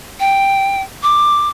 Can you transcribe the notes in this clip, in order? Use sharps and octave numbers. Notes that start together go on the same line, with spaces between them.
G5
D6